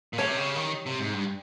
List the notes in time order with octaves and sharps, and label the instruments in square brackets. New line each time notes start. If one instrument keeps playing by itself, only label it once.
[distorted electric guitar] A#2
[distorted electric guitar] C3 [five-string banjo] C#4 G4 C#5
[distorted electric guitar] C#3
D#3
C3
G#2
G2